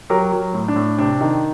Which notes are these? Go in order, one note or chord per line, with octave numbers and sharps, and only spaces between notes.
F#3 G4 A#4
F#3
A2
D4
A2
C3 D4
D#3